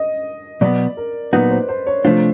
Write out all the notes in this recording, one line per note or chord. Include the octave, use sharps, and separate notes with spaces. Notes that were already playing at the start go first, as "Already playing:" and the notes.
Already playing: D#5
B2 F#3 B3 D5
A#4
A#2 F#3 B3 D#4 F#4 B4
C5
C5
C#5
C3 F3 A3 D4 F4 C5